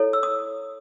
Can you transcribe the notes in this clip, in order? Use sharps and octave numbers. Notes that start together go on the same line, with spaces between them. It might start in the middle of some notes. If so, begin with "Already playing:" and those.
Already playing: E4 A4 C#5
E6
D#6